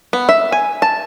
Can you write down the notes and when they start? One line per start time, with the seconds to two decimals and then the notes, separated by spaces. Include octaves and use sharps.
0.13 B3
0.29 E5
0.52 G#5
0.82 A5